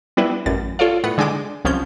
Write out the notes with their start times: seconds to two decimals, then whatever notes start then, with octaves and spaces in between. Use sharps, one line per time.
0.17 G3 B3 D4 E4 B4
0.46 A1 F#2 A6
0.79 F4 A4 C#5 D5 F5
1.04 A2 B3 F#5 C#7
1.18 D3 G#3 D4 G5 D6 D#7
1.65 C2 F3 C#4 G6